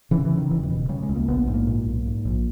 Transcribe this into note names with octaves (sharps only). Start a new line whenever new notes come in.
C#3 E3
E3
C#3
D#3
E1 E3
E3
B2
C#3 G3
G#3
C#2
A#3
A#1 B3
G#2
A#3
A#2
B1
G#2
A#1